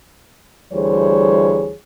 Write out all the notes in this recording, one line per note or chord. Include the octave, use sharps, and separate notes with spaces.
D2 E3 G3 G#4 C5 C#5